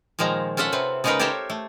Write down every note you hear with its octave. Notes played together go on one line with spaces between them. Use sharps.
A#2 D#3 F3 G#3 A#5
C#4 F4 A4 E5 F#5
C3 C4 B4
C#3 G#3 B3 D#4 A#4 B4
G4 A4 A#4 C5 C#5 E5
A3